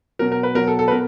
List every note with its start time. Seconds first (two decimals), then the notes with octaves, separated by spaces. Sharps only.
0.19 B2 F#3 A#4
0.32 A#4
0.43 B4
0.55 B2 F#3 A#4
0.67 A4
0.79 A4
0.88 B4
0.91 B2 A#4